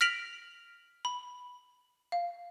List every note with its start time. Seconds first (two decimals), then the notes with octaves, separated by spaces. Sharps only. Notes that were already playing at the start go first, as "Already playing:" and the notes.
0.01 F6 A#6 B6 D7 F7 F#7
1.05 B5
2.12 F5